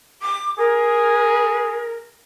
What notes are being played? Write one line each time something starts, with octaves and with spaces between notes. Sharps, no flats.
D6
G#4 A#4